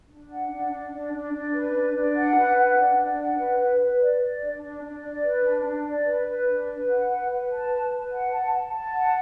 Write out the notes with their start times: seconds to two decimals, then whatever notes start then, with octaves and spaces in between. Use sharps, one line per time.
0.09 D4
0.30 F#5
0.50 D4
0.71 D4
0.91 D4
1.13 D4
1.33 D4
1.53 B4
1.74 D4
1.94 D4
2.15 F#5
2.36 B4
2.56 F#5
2.77 D4
2.97 D4
3.18 F#5
3.38 B4
3.58 B4
3.80 B4
4.01 D5
4.21 D5
4.41 D4
4.61 D4
4.83 D4
5.02 D5
5.24 B4
5.43 D4
5.64 D4
5.85 D5
6.05 B4
6.27 B4
6.47 D4
6.67 B4
6.88 F#5
7.08 B4
7.29 B4
7.49 A5
7.70 B4
7.91 B4
8.11 F#5
8.32 A5
8.52 A5
8.72 A5
8.93 F#5